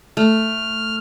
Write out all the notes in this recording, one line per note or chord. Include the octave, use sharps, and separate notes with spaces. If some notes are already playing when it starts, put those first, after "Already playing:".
A3 F6